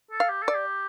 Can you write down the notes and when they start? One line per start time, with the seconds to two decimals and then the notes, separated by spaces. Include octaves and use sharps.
0.11 A4
0.20 F5
0.29 G4
0.43 A4
0.48 D5
0.55 G4